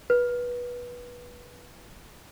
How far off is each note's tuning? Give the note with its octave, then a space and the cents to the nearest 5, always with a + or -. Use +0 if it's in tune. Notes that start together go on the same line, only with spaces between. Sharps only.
B4 -20